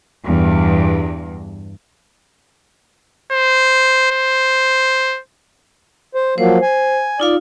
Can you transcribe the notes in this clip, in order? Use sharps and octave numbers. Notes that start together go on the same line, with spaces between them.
E2 G2
C5
C5
C5
F3 F#3 A#3 C5
G#5
D#4 F4 D5 F5